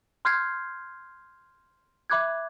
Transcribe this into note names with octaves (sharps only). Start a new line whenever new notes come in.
C6 F6 G6 G#6 C7
E5 B5 D6 F#6 G#6